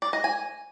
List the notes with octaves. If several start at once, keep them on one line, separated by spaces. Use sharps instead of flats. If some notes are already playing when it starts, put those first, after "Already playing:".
D5
D#5
G#5